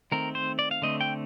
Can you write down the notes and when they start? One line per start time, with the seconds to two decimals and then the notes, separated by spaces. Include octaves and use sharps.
0.12 D#3 A3 C4 A#4
0.35 C5
0.59 D5
0.71 F5
0.82 D3 A3 C4 D#5
1.01 G5